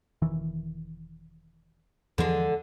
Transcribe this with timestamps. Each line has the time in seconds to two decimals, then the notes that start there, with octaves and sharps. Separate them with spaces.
0.22 E1 D#3 E3
2.18 E2 D3 E3 F3 G#3